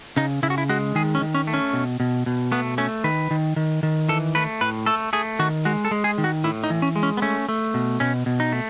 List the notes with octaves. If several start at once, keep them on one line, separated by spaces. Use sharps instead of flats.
C#3 D#4
C#3 E4
F#4
E4
G#3 F#4
D#3 G#4
C#4
D#3
C#4
A3
C#4
B2
B2
B2
A3 B3
A3 C#4
D#3 B4
D#3
D#3
D#3
E3 A4
A3 B4
A2 B4
A3 A4
A3 G#4
D#3 F#4
G#3 F#4
A4
G#3
G#4
D#3
F#4
A2 E4
D#4
E3
C#4
G#3
C#4
B3
A3 C#4
A3
B2
B2 C#4
B2
D#4
A3